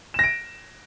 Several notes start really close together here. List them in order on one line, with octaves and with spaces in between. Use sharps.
E7 A#6 D7